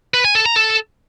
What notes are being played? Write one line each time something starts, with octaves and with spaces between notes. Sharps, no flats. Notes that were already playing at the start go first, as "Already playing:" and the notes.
B4
G#5
A4
A#5
A4